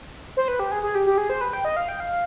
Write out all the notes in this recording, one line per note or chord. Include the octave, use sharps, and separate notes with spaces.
C5
B4
G4
G#4
G#4
G4
G4
G#4
C5
B4
G5
D#5
F5
G5
F5